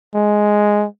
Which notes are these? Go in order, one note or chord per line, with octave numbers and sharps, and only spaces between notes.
G#3